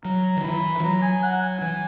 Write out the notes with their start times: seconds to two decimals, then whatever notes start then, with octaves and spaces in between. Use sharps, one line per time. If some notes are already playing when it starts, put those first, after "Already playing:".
0.04 F#3 A#5
0.37 D#3
0.43 E3 B5
0.78 E3
0.83 F#3 A#5
1.02 G#5
1.23 F#5
1.41 G#5
1.61 E3